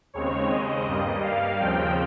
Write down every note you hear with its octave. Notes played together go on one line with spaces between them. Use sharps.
D#2 C#3 G#3 C4 C#5
D#5
G2 G3 A#3
F5
D#2 C#3 F3 C4 G5